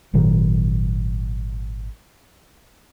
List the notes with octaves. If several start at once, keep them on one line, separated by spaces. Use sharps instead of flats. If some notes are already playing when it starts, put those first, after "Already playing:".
G#1 A#2 D#3 F#3